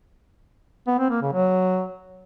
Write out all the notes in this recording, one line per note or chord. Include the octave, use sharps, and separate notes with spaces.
B3
C4
A#3
C#3
F#3